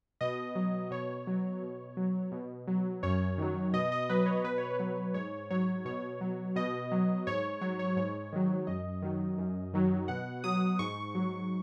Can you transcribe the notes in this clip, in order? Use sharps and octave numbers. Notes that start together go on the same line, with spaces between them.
B2 D#5
F#3
B2 C#5
F#3
B2
F#3
B2
F#3
F#2 C#5
D#3 F#3
B2 D#5
D#5
F#3 B4
C#5
B2 B4
C#5
B4
F#3
G#2 C#5
F#3 C#5
B2 C#5
F#3
B2 D#5
F#3
G#2 C#5
F#3 C#5
C#5
G#2 C#5
D#3 F#3
F#2 D#5
D#3 F#3
F#2
D#3 F#3
B2 F#5
F#3 D#6
G#2 C#6
F#3